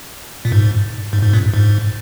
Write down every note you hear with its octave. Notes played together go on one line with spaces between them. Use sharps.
A#2
G#2
G#2
G#2
G2 A#2
G#2